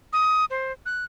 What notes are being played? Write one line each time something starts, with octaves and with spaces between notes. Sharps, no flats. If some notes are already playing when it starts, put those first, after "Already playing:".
D#6
C5
F#6